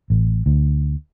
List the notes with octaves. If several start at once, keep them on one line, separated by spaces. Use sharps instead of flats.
A1
D2